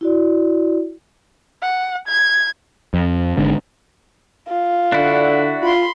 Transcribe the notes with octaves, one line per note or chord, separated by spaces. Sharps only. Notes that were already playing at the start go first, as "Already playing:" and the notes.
E4 F#4 D5
F#5
G#6
F2
G#1 G#2 D3
F4
D3 D4 E4 F#4
F4 B5 C6